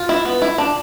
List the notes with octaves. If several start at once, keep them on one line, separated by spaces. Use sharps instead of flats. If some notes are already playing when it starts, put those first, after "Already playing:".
Already playing: F4
E4
B3
E4
D4